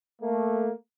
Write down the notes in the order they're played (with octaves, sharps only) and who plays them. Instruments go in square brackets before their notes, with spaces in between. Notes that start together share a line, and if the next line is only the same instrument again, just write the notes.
[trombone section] A3 A#3